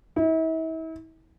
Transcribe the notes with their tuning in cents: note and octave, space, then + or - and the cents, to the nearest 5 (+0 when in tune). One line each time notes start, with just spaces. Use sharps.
E4 -40